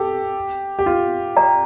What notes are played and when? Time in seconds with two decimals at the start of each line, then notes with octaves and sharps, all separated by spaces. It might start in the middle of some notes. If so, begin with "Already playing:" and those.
Already playing: G4 A4
0.79 G4
0.86 F4
1.36 G4 D5 G5 A#5